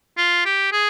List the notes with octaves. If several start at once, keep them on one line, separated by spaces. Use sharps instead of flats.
F4
G4
G#4